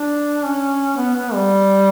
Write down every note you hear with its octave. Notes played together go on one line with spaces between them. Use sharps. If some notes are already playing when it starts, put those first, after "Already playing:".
Already playing: D4
C#4
B3
B3
G3